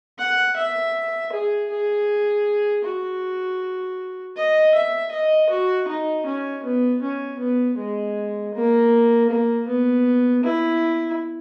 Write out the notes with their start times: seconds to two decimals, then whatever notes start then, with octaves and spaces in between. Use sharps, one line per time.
0.19 F#5
0.56 E5
1.32 G#4
1.70 G#4
2.84 F#4
4.36 D#5
4.74 E5
5.11 D#5
5.50 F#4
5.88 D#4
6.26 C#4
6.63 B3
7.02 C#4
7.39 B3
7.78 G#3
8.54 A#3
9.29 A#3
9.67 B3
10.43 E4